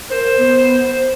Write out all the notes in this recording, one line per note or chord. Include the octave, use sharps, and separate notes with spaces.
A#4 C5
B3